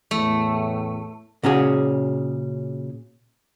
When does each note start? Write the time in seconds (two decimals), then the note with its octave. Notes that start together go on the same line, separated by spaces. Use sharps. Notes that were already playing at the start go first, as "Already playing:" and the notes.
0.11 E2 A2 A3
1.43 A#2 C#3 C#4 F#4 G#4